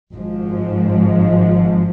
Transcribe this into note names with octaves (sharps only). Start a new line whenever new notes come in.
G#1 G#2 F3